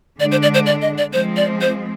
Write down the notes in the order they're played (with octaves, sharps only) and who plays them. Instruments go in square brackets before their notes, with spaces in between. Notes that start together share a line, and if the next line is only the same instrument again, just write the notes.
[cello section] D3 G#3 D4 [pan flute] D5
[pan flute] C5
D5
C5
D5
D#5
D5
[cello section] F3 G#3 C4 [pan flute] C5
[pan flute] D5
C5